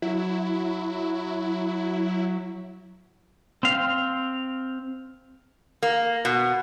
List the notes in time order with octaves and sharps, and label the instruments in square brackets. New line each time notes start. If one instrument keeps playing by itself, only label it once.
[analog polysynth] F#3 [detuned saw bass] E4
[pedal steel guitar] C4 F5
[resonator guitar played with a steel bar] A#3
B2